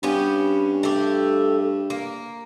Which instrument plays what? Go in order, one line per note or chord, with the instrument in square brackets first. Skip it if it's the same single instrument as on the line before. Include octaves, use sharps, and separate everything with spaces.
[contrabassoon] G2 [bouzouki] B3 C#4 G4
[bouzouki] A3 G4
A#3